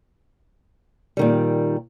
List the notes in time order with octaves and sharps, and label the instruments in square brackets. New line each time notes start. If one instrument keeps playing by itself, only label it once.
[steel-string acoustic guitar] A#2 D#3 G3